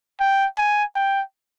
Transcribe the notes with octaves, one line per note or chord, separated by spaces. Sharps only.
G5
G#5
G5